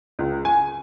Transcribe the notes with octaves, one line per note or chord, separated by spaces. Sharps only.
C#2
G#5